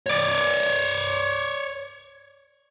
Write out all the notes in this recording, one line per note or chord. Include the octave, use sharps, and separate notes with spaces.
C#5 D5